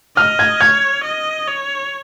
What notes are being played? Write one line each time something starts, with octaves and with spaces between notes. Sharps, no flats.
D#5 F6
G#6
C#5 G#6
D#5
C#5